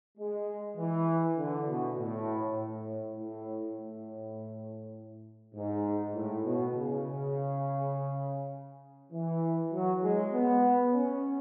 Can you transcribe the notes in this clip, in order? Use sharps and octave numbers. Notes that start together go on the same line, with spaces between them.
G#3
E3
D3
B2
A2
A2
A2
A2
G#2
A2
B2
C#3
E3
F#3
G#3
B3
C#4